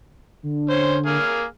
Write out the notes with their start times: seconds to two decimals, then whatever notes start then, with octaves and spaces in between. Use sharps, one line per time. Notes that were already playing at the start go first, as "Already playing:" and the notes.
0.43 D3
0.70 C#4 C5
1.06 A#3 G#4 F6